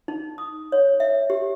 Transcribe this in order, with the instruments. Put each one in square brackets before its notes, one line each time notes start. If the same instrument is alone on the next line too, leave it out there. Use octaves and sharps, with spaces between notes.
[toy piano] D#4
D#6
C#5
E5
G4